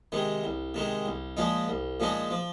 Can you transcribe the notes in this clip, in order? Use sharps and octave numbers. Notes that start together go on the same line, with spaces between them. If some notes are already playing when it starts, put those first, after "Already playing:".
C3 D#3 G#3
C2
C3 D#3 G#3
C2
A#2 F3 G#3 D#4
C2
A#2 F3 G#3 D#4
F3